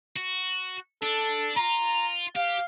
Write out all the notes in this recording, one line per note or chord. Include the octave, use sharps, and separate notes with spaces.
F#4
D4 A4
F4 A#5
G4 F5